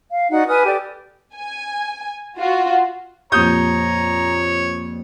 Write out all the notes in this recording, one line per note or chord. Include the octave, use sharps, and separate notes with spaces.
F5
D#4 F#4 D5 F#5
B4 G#5 D#6 F6
G4 A4 D5
G#5
F4 F#4
F2 A#2 G4 C#5 A#5 D#6 G6